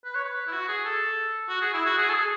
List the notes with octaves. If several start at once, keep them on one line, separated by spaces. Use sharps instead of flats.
B4
C#5
B4
E4
F#4
G#4
A4
F#4
G#4
E4
F#4
G#4
A4
G#4